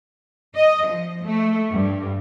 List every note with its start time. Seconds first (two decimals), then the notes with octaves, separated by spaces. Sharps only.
0.54 D#5
0.85 F3
1.22 A3
1.71 G2